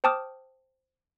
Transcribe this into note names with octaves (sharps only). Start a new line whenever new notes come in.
C5 G5 A5 D6 D#6 F6